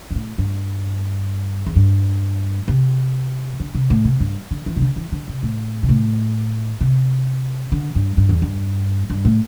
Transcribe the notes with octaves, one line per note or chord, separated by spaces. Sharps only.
G2
A2
G2
E2
G2
C3
D3
C3
A2
C3
G2
D3
E3
C3
D3
E3
D3
C3
A2
C3
A2
C3
D3
G2
G2
E2
G2
G2
A2